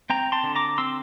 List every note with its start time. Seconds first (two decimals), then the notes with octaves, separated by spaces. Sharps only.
0.10 C4 G5 A#5
0.32 A5 C6
0.43 D3
0.55 A#5 D6
0.78 C4 C6 E6